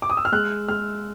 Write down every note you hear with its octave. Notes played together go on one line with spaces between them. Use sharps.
D6
D#6
E6
F6
G#3 F#6
G#3 F6